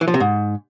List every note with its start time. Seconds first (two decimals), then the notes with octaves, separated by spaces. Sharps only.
0.01 E3
0.08 F3
0.14 C3
0.20 G#2